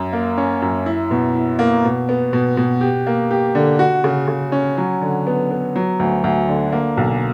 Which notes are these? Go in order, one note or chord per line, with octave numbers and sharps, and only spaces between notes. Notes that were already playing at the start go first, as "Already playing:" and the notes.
Already playing: F#2
A#3
C#4
F#2
E4
B2
E4
A#3
B2
B3
B2
B2
G4
A#3
G4
D3
F#4
C#3
C#3
C#4
F#3
D3
B3
B3
F#3
D2
D2
D3
A#3
B1